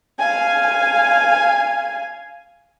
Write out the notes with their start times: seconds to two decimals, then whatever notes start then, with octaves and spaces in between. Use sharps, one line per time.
0.20 F5 G#5